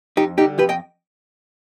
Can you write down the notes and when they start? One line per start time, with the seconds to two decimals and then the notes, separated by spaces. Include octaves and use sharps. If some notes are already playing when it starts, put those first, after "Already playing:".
0.17 F2 D#4 G4
0.38 D3 G3 D#4 G4
0.58 F2 G4 B4
0.69 D#5 G5